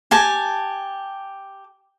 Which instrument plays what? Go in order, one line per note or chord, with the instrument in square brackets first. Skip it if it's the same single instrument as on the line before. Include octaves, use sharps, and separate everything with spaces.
[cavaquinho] G4 G#5 A5